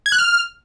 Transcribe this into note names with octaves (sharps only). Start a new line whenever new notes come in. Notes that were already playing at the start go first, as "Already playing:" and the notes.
G#6
F#6
F6